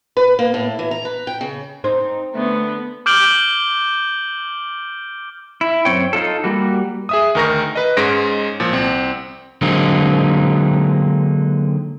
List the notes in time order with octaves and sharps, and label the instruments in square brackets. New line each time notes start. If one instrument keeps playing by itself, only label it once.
[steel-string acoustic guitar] B4
A#3
A2
E3
A#5
B4
G5
C#3
[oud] C4 [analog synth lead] D#4
[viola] D3 B3 [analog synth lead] A3
[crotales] D6 F6 G6 D7 F#7 G7
[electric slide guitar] E4
F#2 C4 C#5 G5
D#4 F4 A4
G3 A#3 F#4
[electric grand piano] G#4 E5 D#6
D2 D#3 A#4 C#6 A#6
B4 D#5
G#2 G#3 C#4 A#6 D7
A#2 F3
C2 C4
[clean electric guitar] D3 F#3 G#3 A#3 C4 D#4